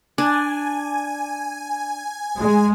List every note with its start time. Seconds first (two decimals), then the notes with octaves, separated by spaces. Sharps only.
0.18 D4 G#5
2.38 G#3